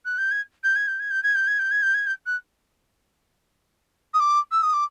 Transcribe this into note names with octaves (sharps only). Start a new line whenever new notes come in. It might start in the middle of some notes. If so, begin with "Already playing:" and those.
F#6
G6
G#6
G6
G#6
G6
G#6
G6
G#6
G6
G#6
G6
G#6
G6
G#6
G6
F#6
D#6
D6
E6
D#6
D6